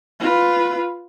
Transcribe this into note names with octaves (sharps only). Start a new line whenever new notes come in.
F4 B4